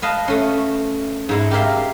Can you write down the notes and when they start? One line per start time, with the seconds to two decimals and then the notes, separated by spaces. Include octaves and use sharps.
0.02 B4 D#5 F5 A5
0.28 A3 C#4
1.29 G#2 G#3 E4
1.51 G4 A#4 E5 F5